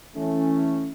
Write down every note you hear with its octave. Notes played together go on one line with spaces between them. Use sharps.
E3 A3 C#4